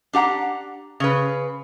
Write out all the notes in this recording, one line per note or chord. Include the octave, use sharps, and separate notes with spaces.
D4 G4 F#5 A#5
C#3 B4